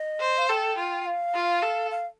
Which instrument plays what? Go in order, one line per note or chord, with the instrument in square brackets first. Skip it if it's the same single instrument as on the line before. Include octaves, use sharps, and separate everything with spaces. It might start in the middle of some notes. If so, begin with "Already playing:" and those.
Already playing: [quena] D#5
[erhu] C5
[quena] F5
[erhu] A4 [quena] G5
[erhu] F4
[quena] F5
[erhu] F4
A4
[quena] F5